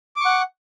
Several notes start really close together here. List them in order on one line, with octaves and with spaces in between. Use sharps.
D6 C#6 F#5